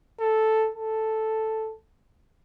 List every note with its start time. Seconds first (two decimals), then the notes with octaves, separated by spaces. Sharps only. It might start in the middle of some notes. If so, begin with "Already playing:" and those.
0.20 A4
0.74 A4